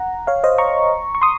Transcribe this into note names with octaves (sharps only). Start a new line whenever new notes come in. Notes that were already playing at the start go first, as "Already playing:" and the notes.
Already playing: F#5 A#5
C#5 F5
C5 D#5
A#5 C#6
C#6
C6 D#6